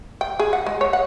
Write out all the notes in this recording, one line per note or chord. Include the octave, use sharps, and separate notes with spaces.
G5
G#4
F#5
G#3
C#5
F#5